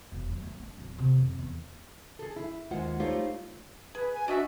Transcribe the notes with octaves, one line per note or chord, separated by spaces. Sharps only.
E1
F#2
A3
D4
D1
C3
F2
E2
G#4 A4
E4
D#2 G#3 F4 C5 F#5
G3 A3 D#4 F4 C5 C#5
G#4 B4
G#5
D4 F#4 D#5 E5